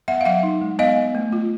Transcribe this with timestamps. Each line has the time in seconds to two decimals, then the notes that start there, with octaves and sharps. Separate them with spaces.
0.08 B3 E5 F#5
0.21 F5
0.25 F#3 E5 F#5
0.43 D#4
0.61 G#3
0.79 B3 D#5 F5
0.97 B3
1.15 A3
1.33 F4